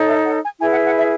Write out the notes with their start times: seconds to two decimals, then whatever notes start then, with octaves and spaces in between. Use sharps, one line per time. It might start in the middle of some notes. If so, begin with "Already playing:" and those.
Already playing: D#4 A4 C#5
0.08 E5
0.25 F#5
0.42 G#5
0.59 E4 G#4 B4 G#5
0.71 F#5
0.85 F#5
0.96 E5